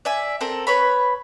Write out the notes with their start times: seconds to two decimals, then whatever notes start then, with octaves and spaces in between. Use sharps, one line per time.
0.05 D5 E5 G#5
0.41 C4 A4 A#4
0.67 B4 C#5 B5